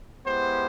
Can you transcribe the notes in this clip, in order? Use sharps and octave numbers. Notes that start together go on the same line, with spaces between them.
G#3 B3 E4 G4 C5